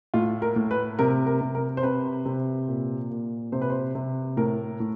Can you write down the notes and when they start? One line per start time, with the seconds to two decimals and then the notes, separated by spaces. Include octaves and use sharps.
0.14 A2 F4
0.42 A#4
0.56 A2
0.71 B4
0.99 C3 A#4
1.27 A#4
1.41 C3
1.55 A#4
1.77 C5
1.83 C3 B4
2.26 C3
2.68 A#2
3.11 A#2
3.52 C3 C5
3.62 B4
3.70 C5
3.95 C3
4.37 A2 A#4
4.80 A2